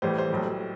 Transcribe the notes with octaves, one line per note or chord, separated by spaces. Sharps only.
A1 A2 E3 G3 C5
C5
B1 A2 G3